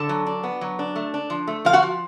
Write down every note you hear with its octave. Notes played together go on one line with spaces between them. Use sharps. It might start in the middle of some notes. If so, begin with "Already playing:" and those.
Already playing: D3 A4 A5
F#3
D4
B3
F#3
D4
A3
D4
F3
A3
F3 F5
F#4 F#5
F3